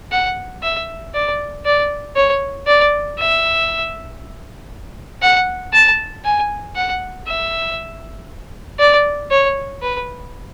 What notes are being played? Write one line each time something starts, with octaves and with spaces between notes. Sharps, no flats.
F#5
E5
D5
D5
C#5
D5
E5
F#5
A5
G#5
F#5
E5
D5
C#5
B4